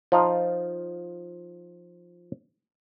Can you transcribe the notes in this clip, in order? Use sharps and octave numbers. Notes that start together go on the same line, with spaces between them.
F3 D#4 F4